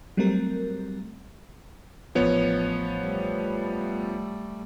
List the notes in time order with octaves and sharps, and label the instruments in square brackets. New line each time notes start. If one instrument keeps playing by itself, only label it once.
[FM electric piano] F#3 G3 A3 C4 A#4
[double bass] A1 [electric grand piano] F3 B3 C#5
[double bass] G3 A3